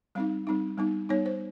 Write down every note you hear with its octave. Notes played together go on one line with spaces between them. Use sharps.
G3 C4 D#4 F5
G3 C4 D#4
G3 B3 D#4
G3 B3 D#4 C#5
C5